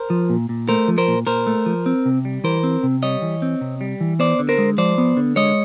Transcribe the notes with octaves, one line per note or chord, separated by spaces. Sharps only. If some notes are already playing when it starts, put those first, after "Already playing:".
Already playing: A#4 C5
F3
A#2
A#2
A3 A#4 C5
F3
A#4 C5
A#2
A#2 A#4 C5
A3
F3
C4
C3
G3
E3 A#4 C5
C4
C3
G3 C#5 D#5
E3
C4
C3
G3
E3
B3 C5 D5
D3
A#4 C5
G#3
F3 C5 D5
B3
D3
G#3 C#5 D#5